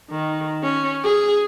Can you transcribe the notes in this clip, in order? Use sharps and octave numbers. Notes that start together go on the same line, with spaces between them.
D#3
C#4
G#4